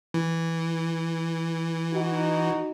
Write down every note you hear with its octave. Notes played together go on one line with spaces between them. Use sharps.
E3
D#4 F#4